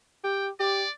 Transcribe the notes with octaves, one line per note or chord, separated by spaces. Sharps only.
G4 G5
G4 D5